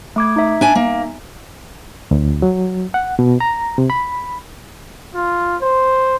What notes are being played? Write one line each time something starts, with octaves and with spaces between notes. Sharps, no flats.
A3 D6 G#6
D#4 E5
D4 G#5
A#3
D2
F#3
F#5
B2
A#5
C3
B5
F4
C5